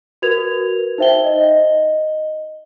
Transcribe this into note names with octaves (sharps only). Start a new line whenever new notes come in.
F#4 A#4 B4 G#6 F7
D#4 C5 E5 G5 G7
D#5